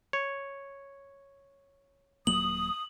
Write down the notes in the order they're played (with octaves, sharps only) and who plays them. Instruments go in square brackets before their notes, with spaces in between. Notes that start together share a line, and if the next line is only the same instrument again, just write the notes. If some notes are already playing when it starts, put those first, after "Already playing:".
[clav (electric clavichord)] C#5
[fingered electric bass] D#1 F#3 A#3 [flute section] D#6 [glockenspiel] F#7